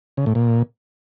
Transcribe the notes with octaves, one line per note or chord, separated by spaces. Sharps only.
C#3
A2
A#2